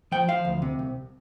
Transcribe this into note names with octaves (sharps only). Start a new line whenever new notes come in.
F3 G5
F3 F5
D2
C3
C2